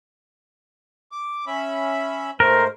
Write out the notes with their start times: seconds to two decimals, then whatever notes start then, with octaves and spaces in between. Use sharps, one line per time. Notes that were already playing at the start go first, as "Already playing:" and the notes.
1.12 D6
1.47 C#4 E5 B5
2.40 G#2 A3 A#4 C5